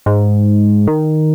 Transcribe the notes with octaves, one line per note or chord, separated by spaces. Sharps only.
G#2
D#3